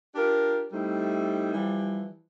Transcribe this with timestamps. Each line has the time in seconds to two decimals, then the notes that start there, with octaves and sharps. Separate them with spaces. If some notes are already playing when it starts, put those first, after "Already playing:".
0.15 D4 F4 G4 A#4
0.72 G3 A3 C4 D#4 E4
1.53 E3 F3 G3